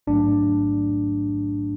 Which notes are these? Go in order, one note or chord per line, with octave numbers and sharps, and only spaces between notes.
A1 G#2 F#3 A3 D4